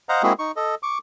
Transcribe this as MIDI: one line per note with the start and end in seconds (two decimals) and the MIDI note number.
0.09 0.22 72
0.09 0.22 75
0.09 0.22 77
0.09 0.22 78
0.09 0.22 82
0.23 0.33 56
0.23 0.33 58
0.23 0.33 60
0.23 0.33 64
0.23 0.33 66
0.23 0.33 68
0.39 0.52 63
0.39 0.52 85
0.56 0.75 69
0.56 0.75 75
0.83 0.98 85
0.83 0.98 86